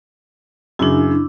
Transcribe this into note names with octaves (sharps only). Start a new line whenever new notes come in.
F#2 C#3 D4 E4